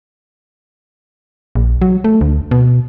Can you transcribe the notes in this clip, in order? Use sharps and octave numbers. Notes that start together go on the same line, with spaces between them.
A#1
F#3
A3
D2
B2